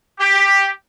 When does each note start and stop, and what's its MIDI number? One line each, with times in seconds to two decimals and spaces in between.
0.20 0.67 67